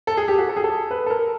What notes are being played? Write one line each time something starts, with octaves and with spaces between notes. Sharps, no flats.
A4
G#4
G4
F#4
A4
G#4
A4
B4
A4
A#4